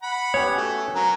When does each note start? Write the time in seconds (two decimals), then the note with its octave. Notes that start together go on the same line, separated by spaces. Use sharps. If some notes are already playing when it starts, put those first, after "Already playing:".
0.03 F#5 B5
0.34 B3 C#4 G4 C#5
0.57 A3 F#4
0.94 F#3 A#4 A#5